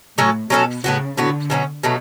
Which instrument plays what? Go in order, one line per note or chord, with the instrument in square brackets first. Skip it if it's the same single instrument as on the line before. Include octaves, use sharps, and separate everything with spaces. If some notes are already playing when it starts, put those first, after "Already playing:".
[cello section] A2 [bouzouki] F#3 C#4 F#4 A4
[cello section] B2 [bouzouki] F#3 C#4 F#4 A4
[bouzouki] A2 F#3 B3 F#4 [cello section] C#3
[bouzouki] A2 F#3 B3 F#4 [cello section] D3
[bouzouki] B2 F#3 A3 C#4
B2 F#3 A3